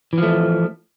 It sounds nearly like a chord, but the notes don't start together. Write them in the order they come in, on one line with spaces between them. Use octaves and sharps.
E3 F3 A3